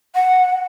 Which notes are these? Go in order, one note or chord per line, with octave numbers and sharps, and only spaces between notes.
F#5